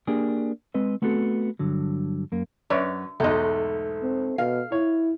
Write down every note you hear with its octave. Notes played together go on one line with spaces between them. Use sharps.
A#3 D4 G4 G#4
G#3 C4 B4 D#5
A3 B3 C4 F#4 A4
G2 D3 F#3
F#2 A#3
F#2 B4 C#5 D5
B1 E2 G#2 A3 D#5
C4
B2 F5
E4 C#5